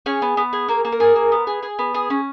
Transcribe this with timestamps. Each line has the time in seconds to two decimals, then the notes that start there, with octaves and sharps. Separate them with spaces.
0.06 C#4 G#4 C#5
0.22 B3
0.37 B3
0.53 G#4
0.68 A#3 A#4
0.85 A#3
0.92 A#4
1.00 G#4
1.15 A#3
1.32 B3
1.47 G#4
1.62 G#4
1.79 B3
1.94 G#4
2.10 C#4